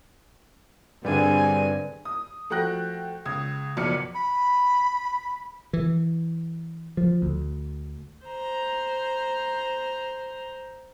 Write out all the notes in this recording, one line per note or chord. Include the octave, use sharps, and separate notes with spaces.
G2 D3 G3 C4 D4 G#4 G#5
D#6
F3 A3 F#4 G5 F#6 A#6
C#2 D#6 G#6
F#1 B1 F2 D5 F6 C#7
B5
E3
F3
D2
C5 A#5